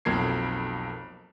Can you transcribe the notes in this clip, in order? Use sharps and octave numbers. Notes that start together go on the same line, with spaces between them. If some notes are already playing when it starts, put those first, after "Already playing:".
B1 F2 A#3 G#6 C7